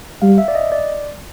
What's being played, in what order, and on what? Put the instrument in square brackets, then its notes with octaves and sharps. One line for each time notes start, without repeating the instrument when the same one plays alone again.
[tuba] G3 [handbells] F5
[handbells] E5
D5
D#5
D5